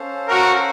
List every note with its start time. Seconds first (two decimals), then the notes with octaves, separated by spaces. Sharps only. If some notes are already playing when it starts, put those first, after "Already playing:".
Already playing: C#4 A4 C5 F5
0.28 F#4 A#4